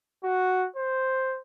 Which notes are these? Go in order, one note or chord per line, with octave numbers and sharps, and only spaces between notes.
F#4
C5